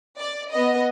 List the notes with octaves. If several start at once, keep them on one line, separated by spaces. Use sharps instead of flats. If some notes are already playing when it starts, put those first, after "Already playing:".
D5
B3 D#5